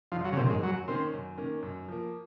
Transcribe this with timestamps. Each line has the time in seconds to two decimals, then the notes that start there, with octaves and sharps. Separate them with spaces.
0.12 F#1 F3
0.25 F#3
0.32 C#3
0.37 F2 C3 D#3 A#3
0.50 G#2
0.62 F#2 F#3
0.88 D#3 A#3 C4 C#4
1.13 F#2
1.37 D#3 A#3 C#4
1.63 F#2
1.88 F3 A#3